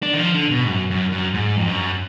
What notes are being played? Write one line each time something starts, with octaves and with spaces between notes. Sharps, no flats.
D4
D#3
F3
D3
B2
G#2
F#2
F#2
F#2
G#2
F2
F#2